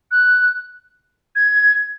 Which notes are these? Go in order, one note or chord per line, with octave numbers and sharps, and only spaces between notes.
F#6
G#6